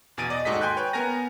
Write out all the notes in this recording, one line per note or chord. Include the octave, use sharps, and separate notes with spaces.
E2 B2 G#5 A6 D7 D#7
D5 D#5
D#2 G#2 F#4 A4 D#5 B6
G5 G#5 C6 F#6 G6
B4 C#5 G5
B3 A#4 G#5 A#5 A#6